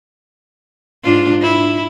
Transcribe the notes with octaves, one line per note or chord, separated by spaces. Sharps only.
G#2 D4 F4
E4